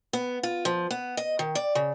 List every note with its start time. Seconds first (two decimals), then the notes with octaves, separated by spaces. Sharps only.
0.13 B3
0.43 F4
0.65 F3
0.90 B3
1.17 D#5
1.39 D#3
1.55 D5
1.75 C#3